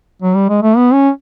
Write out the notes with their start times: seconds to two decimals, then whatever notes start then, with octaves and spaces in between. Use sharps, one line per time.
0.22 F#3
0.35 G3
0.49 G#3
0.62 A3
0.76 B3
0.93 C#4